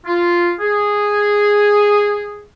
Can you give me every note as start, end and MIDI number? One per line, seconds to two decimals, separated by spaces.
0.05 0.53 65
0.59 2.43 68